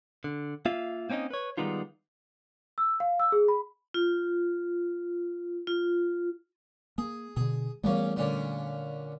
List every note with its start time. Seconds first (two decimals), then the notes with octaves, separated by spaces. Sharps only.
0.24 D3
0.65 A#3 F4 E5 F5
1.10 A#3 C4 C#4 D#4 D#5
1.31 B4 C#5
1.57 D#3 G3 G#3 B3 D#4 F4
2.78 E6
3.00 F5
3.20 E6
3.32 G#4
3.48 B5
3.94 F4
5.67 F4
6.98 A#3 G#4
7.37 B2 D3 G#4
7.84 E2 E3 G3 A3 A#3 C#4
8.16 A#2 D3 C#4